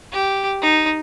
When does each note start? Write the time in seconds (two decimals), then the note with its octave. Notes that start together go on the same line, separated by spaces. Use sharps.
0.12 G4
0.61 D#4